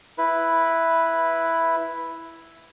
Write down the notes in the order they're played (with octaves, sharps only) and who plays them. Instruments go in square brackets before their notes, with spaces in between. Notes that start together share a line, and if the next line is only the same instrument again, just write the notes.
[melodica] E4 B4